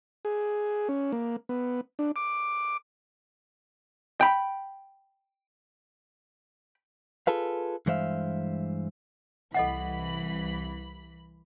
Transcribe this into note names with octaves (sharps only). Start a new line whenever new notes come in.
G#4
C#4
A#3
B3
D4
D6
G5 B5
F4 G#4 A4 B4 F5
G2 E3 G#3 C5 E5 F5
C2 E3 A4 D#5 F#5 B5